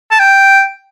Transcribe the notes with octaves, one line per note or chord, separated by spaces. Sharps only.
A5
G5